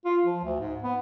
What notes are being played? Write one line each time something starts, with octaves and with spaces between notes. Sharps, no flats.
F4
F3
D2
G#2
B3